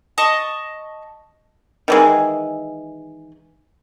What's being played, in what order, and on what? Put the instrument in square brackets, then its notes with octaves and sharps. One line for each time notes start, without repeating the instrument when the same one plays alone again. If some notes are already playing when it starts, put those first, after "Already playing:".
[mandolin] D#5 A5 C#6 D#6
[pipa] D#3 E3 G#3